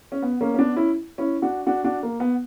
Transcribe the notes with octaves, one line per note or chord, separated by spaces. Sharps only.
C#4
B3
A#3 C#4
C#4
B3 D4
C#4 E4
C#4 E4
D4 F#4
D4 F#4
D4 F#4
A#3
B3